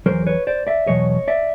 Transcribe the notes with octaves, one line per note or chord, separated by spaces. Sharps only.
E2 C#3 F#3 A#4 C5
B4 C#5
C5 D5
D5 E5
E2 B2 F#3 C#5 D#5
D5 E5